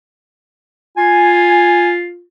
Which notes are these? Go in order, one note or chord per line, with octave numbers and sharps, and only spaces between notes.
F4 G#5